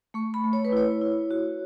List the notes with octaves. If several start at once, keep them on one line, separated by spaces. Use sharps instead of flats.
A3 C#6
B5
A3
C#5
B4
E4 C#5
E4
F#4